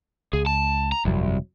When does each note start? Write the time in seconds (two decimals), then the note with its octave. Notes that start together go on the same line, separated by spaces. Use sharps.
0.33 C#2 G#4
0.46 A5
0.92 A#5
1.05 G1 C2 F2 F#3